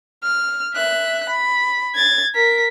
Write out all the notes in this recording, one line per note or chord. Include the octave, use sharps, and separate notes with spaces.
F6
E5 F#6
B5
G#6 A6
A#4 B6